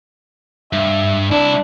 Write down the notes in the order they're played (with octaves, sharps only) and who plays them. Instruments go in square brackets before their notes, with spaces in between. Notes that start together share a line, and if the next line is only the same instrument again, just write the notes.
[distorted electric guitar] G2 [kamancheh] E5
[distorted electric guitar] C2 E4 [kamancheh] D4